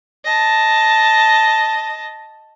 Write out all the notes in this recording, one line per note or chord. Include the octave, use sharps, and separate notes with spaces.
D#5 A5